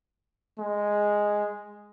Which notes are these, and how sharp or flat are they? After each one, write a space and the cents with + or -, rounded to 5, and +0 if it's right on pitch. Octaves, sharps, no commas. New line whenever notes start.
G#3 -5